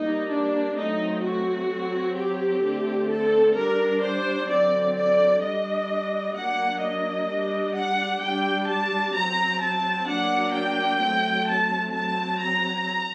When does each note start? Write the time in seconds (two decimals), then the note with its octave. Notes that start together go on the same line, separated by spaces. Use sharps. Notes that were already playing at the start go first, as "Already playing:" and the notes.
Already playing: G3 A#3 D#4
0.29 D4
0.75 F#3 A3 C4 D#4
1.23 F#4
1.69 F#3 C4
2.16 G4
2.63 D3 A3 C4
3.09 A4
3.55 G3 D4 A#4
4.02 C5
4.48 D3 F#3 C4 D5
4.95 D5
5.42 G3 D4 D#5
6.35 F#3 A#3 D4 F#5
6.81 D#5
7.28 G3 D4
7.74 F#5
8.21 G3 D4 G5
8.68 A5
9.14 F#3 C4 A#5
9.61 A5
10.08 F#3 A#3 D4 F#5
10.54 G5
11.01 F#3 A3 C4
11.48 A5
11.94 F#3 C4 A5
12.40 A#5